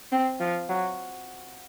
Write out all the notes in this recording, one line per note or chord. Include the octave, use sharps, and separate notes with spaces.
C4
F3
F#3